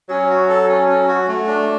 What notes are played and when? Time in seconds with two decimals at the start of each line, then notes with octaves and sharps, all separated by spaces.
0.09 F#3 C#4
0.29 F#4
0.49 A4
0.69 C#4
0.89 C#4
1.08 F#4
1.28 A3
1.47 D4